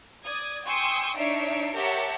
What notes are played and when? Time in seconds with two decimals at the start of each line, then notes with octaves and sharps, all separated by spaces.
0.24 D5 D#6 G#6
0.65 G5 G#5 C6 C#6 D#6 E6
1.16 D4 D#4 C#5 E5 C7 D7
1.74 G4 A#4 C#5 E5 F#5 A5